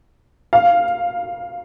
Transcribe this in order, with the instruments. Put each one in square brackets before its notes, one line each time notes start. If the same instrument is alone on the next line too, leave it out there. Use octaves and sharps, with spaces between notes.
[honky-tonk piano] F5